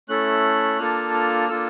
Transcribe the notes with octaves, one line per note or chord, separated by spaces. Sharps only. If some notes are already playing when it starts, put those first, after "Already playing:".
A3 C#4 E4 A4 F#6
A#3 D4 F4 A4 F6
F6
A#3 D4 F4 A4 E6